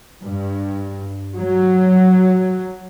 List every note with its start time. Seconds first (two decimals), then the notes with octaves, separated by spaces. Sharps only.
0.24 G2
1.35 F#3